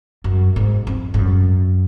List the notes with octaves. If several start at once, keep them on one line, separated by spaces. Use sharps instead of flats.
F#2
G#2
F2
G#2
F#2